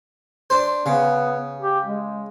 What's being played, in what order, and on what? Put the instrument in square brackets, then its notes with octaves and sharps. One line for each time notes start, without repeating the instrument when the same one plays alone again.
[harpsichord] D4 C5
[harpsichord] C#3 [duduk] B3
[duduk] G4
G#3